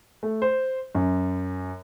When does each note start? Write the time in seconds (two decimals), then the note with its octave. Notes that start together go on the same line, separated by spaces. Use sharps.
0.23 A3
0.42 C5
0.95 F#2